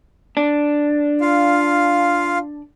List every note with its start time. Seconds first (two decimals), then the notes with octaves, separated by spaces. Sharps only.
0.37 D4
1.21 F4 F5